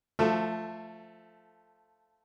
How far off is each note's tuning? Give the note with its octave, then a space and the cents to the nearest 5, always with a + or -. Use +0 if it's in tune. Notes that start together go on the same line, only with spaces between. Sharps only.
F3 -5 A3 +0 A4 +20